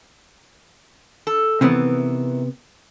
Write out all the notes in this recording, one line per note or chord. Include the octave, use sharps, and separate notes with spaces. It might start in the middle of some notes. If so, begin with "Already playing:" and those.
A4
C3 D#3 E3 B3